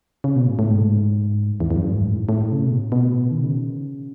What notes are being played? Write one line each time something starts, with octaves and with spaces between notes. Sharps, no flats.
C#3
B2
A2
A2
G#2
E2
E2
F#2
G#2
A2
A2
C#3
B2
A2
B2
D#3
C#3